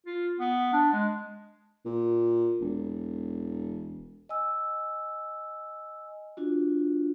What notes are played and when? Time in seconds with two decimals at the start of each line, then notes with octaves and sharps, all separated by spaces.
0.06 F4
0.40 B3
0.73 D4
0.93 G#3
1.85 A#2
2.60 E1
4.29 D#5 G#5 E6
6.37 D4 F4 F#4